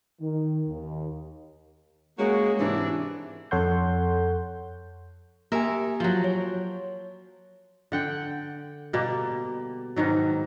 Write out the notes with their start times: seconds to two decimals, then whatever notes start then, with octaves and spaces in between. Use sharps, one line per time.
0.21 D#3
0.69 D#2
2.19 G#3 A#3 C#4 F#4
2.59 G#2 C3 E3 D4
3.51 F2 A4 C#5 F#5 C6 G6
5.52 A#3 G4 A#4 E5 G#5
6.00 F3 F#3
6.24 C#5
7.92 D3 F#5 G5
8.93 B2 G3 A#3
9.96 G#2 B2 D#3 F#3